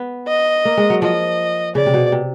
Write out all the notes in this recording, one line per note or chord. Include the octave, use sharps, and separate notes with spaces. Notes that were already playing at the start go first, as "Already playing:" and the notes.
Already playing: B3
D#5
A#3
G#3
F#3
F3 D#5
C#3 D5
C3
B2
C3